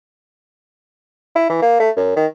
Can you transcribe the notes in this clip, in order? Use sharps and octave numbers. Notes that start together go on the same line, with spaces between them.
E4
E3
A#3
A3
F#2
D#3